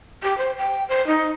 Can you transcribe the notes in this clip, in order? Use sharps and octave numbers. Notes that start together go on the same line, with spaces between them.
G4
C5
G5
C5
D#4